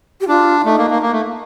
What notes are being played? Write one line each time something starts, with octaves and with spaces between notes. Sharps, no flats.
G4
D4 F4
F4
A3 D#4
A#3
A#3
A#3
A3